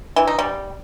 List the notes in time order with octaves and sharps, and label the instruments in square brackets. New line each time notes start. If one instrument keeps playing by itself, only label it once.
[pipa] E3
D#4
G3